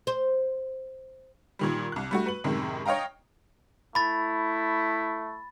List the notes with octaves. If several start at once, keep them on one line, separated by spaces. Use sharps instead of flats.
C5
A#2 D#3 G3
C2 F#6
G3 A3 F#4
B4 F#7
F#2 A2 C3 D#3 G#3
C#5 D#5 F5 G5 A#5
A3 E4 B5 A6